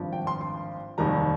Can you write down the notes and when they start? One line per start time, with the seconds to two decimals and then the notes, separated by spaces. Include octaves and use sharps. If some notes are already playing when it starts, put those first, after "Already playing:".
Already playing: G#1 G2 F3
0.13 G5
0.27 C6
0.41 C6
0.98 F1 D#2 D#3 G3 A#5